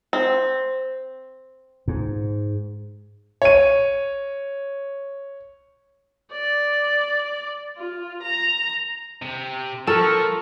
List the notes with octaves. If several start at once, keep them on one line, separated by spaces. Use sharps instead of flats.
C4
G#2
C#5 D#7
D5
F4
A#5
C3
F3 A4 A#4 A5 C#6